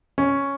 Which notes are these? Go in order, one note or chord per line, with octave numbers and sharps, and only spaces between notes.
C#4